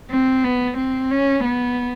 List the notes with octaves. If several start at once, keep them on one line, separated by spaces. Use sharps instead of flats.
C4
B3
C4
C#4
B3